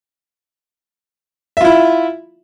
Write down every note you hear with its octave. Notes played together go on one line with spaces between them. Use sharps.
E4 F4 E5